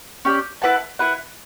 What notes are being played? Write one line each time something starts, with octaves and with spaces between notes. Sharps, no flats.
C#4 G4 D5
E4 B4 F#5 A5
E4 B4 F#5